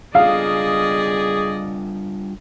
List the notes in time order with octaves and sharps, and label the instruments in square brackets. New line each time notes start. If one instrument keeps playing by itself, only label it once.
[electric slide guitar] G3 D4 F4 [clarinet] G#4 [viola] D5 D#5 [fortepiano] F5